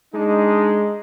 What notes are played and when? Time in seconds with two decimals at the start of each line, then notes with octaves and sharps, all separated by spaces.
0.14 G#3 D4 D#4